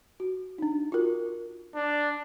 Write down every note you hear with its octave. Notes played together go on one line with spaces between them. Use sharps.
F#4
D4 D#4
F4 F#4 A#4
D4